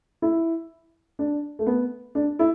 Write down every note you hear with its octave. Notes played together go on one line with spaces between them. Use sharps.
E4
D4
A3
B3
D4
E4